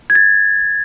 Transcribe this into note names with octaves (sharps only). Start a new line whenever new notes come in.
G#6
A6